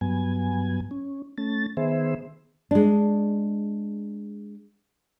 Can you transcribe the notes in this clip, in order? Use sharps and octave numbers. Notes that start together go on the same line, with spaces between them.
G2 F#3 B3 G#5
C#4
A3 C#4 A6
D#3 B3 G#4 C5 E5
G#3 D4